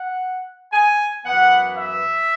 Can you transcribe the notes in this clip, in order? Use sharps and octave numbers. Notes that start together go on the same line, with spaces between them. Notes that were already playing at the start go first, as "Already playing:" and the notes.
Already playing: F#5
G#5
F#2 E3 B3 F#5
E5